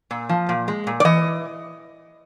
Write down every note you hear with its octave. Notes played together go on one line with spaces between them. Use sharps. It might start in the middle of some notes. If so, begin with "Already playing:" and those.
A#2
F3
A#2
G#3
A#2
D5
E3 D#5